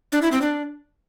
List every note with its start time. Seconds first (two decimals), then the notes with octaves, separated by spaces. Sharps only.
0.12 D4
0.22 E4
0.32 C4
0.42 D4